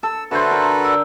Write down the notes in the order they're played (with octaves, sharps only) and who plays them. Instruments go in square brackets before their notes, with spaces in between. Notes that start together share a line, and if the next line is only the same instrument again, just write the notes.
[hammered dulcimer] A4 [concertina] E6
[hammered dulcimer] D3 C5 [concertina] F#4 A4 B4 [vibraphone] E5 C6
[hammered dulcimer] A#4
[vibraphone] D5 E6